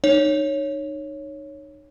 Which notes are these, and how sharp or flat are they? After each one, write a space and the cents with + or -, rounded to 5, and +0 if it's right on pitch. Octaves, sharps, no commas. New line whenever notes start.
D#4 -25 C#5 +0